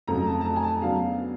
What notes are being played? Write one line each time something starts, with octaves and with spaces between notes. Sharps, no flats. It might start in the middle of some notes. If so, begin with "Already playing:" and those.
F2 C#3 F#3 A3 A#5
A5
A5
A#5
G#5
A5
C#3 F#3 B3 D4 F5